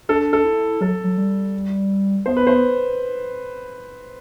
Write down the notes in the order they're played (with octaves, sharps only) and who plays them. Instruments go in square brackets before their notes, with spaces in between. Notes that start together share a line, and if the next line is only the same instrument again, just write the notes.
[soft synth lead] D4 [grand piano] A4
[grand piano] A4
[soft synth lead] E4
[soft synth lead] F#3 [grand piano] A4
[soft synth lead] F#3
G3
[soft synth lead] B3 [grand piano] C5
[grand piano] B4
C5